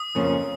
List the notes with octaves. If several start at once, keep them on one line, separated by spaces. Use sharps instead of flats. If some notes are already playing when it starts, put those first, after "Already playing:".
Already playing: D#6
F2 C#3 F3 A#3 C#4